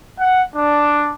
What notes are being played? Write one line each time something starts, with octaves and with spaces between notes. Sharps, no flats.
F#5
D4